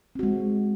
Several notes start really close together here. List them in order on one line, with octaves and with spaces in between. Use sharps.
C4 F#4 G#3